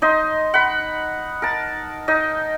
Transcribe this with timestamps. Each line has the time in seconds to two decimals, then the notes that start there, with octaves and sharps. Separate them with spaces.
0.02 D#4 D#5 C6
0.54 F#5 B5
1.42 A#4 A5
2.08 D#4 D#5